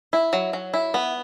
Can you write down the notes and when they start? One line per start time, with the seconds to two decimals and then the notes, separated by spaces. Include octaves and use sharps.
0.13 E4
0.33 F#3
0.53 F#3
0.74 E4
0.94 B3